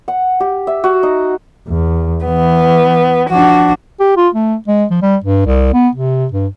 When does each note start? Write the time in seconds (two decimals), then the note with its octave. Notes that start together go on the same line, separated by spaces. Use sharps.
0.08 F#5
0.40 G4
0.67 E5
0.84 F#4
1.03 D#4
1.68 E2
2.26 E3 B3
3.30 F3 D4 F#4
4.00 G4
4.17 F4
4.35 A3
4.67 G#3
4.90 F3
5.02 G3
5.24 G2
5.46 C2
5.74 B3
5.95 C3
6.32 G2